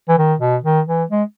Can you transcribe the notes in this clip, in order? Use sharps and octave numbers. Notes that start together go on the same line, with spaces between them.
E3
D#3
B2
D#3
E3
G#3